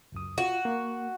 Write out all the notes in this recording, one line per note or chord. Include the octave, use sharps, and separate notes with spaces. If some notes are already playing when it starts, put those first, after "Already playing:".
C#2 F#2 D#6
F4 F#4
A#3